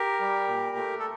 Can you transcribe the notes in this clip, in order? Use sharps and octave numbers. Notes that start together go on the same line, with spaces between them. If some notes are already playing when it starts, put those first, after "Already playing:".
Already playing: G4 A#4
G3
A#2
A3
A4